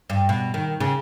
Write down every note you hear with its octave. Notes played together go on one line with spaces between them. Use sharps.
G2
B2
D#3
C#3